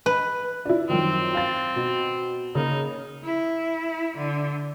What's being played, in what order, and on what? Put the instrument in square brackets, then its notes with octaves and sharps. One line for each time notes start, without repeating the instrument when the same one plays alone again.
[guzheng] B4
[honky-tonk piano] D4 E4
[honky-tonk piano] F#2 D#3 F3 [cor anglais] C4
[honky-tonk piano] F5 A6
B2
[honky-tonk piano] C#3 A#3 [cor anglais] D#4
[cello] E4
D3